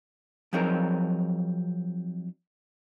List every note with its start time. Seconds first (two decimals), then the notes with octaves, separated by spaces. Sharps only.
0.53 F3 F#3 C4 D#4 G#4 A#4